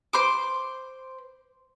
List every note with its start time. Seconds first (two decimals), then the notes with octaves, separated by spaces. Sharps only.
0.13 C5 C6 D6